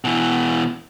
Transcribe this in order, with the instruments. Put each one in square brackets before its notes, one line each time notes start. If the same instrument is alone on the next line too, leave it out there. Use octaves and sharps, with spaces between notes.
[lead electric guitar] B2 E3